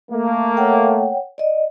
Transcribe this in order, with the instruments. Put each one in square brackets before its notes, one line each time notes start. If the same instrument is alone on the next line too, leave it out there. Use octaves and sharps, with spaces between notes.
[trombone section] A3 A#3
[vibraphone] C#5 F#5 G5
D5 D#5